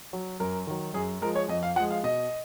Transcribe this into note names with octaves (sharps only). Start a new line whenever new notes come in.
F#3
F#2 A#4
D#3 F#3
F#2 G#4
F3 G#3 A#4
C#5
F2 D#5
F5
F3 G#3 F#5
F5
B2 D#5